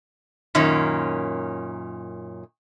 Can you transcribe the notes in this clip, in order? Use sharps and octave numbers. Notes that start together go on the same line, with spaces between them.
F#2 A#2 D#3 C#4